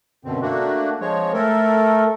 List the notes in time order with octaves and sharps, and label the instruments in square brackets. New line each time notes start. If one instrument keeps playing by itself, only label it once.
[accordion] F#2 B2 D3 C4
A3 A#3 D4 F#4
F3 G#3 C4 C#5
A3 A4 A#4